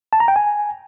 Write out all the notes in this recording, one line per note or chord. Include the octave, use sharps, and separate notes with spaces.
A5
A#5
G5
G#5